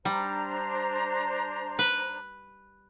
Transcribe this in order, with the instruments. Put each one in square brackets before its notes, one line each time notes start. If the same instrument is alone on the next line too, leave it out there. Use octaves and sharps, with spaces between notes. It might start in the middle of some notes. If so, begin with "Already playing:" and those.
[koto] G3 [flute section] D4 C5 A#5
[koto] B4